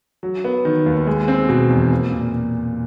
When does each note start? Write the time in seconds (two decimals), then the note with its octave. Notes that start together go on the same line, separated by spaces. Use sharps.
0.23 F#3
0.44 B3
0.65 D#3
0.86 D#2
1.07 G#3
1.28 C4
1.49 B2
1.70 E2
1.91 A#3
2.12 A#2